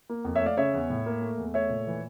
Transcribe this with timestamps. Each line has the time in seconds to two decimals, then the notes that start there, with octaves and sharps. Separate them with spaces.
0.09 A#3
0.25 F2
0.36 C#5 E5
0.41 A3 D5 F5
0.57 C#3 C#5 E5
0.73 E2
0.90 A2
1.06 A#3
1.22 A3
1.38 E2
1.54 A3 C#5 E5
1.70 A#2
1.87 E3